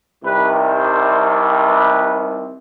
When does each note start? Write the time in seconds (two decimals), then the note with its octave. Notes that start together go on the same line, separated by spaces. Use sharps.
0.24 C2 C3 D#3 G3 B4
0.60 C5
1.66 B4